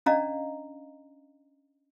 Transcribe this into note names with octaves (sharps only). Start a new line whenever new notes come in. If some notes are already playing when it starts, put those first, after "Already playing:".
C#4 D4 D5 D#5 F5 A#5